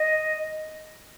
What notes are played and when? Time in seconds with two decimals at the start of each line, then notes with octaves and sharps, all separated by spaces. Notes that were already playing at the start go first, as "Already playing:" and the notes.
Already playing: D#5